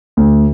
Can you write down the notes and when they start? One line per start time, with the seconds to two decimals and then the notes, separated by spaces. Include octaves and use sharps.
0.17 D2